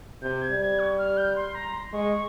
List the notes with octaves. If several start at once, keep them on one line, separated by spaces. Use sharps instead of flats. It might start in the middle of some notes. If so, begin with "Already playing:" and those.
C3 G6
G#6
G3
G#6
C#6
F6
G6
C6
A#5
C6
G#3 C#6